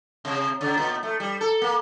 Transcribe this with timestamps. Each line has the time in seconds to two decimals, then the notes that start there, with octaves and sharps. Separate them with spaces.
0.25 C3
0.61 C#3
0.77 A#2
1.03 A3
1.20 G3
1.41 A4
1.62 A#3